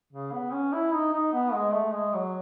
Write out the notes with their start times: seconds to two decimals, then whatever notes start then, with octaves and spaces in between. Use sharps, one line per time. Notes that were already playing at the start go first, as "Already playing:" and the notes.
0.13 C#3
0.33 B3
0.53 C#4
0.73 E4
0.93 D#4
1.13 D#4
1.33 B3
1.54 G#3
1.74 A3
1.93 G#3
2.14 F#3